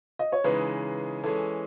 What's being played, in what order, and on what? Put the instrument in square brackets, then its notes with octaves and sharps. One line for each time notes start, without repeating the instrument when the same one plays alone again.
[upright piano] D#5
C#5
[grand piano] C#3 E3 G#3 D#4 [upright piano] B4
[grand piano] E3 G#3 C#4 [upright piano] A4